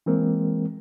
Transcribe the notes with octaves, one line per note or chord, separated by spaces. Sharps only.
E3 G#3 A#3 C4 A#4